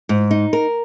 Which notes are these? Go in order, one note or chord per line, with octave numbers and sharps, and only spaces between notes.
G#2
D#4
A#4